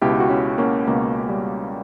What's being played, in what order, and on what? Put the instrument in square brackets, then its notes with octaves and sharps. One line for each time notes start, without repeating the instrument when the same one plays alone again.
[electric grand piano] C#2 B2 E4 G4
F#4
C#4 E4
A#3 C#4
C#2 B2 A#3
G3